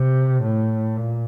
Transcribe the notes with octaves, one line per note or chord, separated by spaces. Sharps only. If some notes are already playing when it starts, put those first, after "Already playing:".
Already playing: C3
A2
A#2